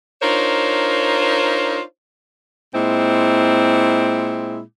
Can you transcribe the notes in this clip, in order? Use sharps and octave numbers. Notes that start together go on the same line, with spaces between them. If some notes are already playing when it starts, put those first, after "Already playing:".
D4 D#4 F4 A#4 C5 C#5
A#2 G#3 C4 E4